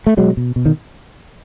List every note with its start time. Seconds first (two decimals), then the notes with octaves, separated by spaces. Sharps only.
0.07 A3
0.17 B2 F#3 G#3
0.37 B2
0.56 B2
0.66 D#3